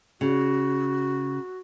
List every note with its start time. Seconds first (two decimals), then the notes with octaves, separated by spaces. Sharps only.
0.21 C#3 F#4